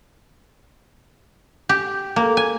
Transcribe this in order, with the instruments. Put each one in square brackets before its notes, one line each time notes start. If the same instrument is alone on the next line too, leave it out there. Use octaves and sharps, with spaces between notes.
[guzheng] G4
A#3
G#5